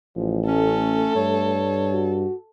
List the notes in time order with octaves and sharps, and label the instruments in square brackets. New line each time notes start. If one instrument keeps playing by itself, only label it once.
[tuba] A1 [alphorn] F3
[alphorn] A3 [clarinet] C#4 [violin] A4
[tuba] G2 [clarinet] C#5
[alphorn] F#4